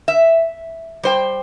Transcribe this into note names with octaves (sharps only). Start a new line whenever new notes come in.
E5
G3 C5 G5